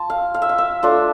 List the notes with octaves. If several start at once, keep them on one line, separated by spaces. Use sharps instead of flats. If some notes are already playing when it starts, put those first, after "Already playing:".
Already playing: F4 A5 C6
F5
F5
E5
F5
E5
A3 D4 F4